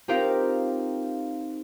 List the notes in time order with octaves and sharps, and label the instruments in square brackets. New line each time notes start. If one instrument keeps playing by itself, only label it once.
[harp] C4 D#4 F4 G4 A#4 F5